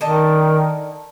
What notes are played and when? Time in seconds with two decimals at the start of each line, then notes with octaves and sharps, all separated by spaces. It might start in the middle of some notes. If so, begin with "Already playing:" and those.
0.01 D3 D#3 D#5 A5